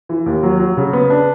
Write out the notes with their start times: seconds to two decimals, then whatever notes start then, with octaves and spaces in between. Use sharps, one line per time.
0.09 E3
0.26 D#2
0.43 F#3
0.60 F#3
0.77 C#3
0.93 B3
1.10 D4